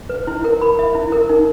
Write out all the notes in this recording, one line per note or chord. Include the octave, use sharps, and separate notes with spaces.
B4
E4
A#4
B5
E5
E4
A#4
D#4